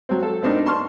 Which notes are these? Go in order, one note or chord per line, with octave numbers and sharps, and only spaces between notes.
F#3 C4
A4
B3 C4 D4 D#4 A#4
A5 C6 C#6 F6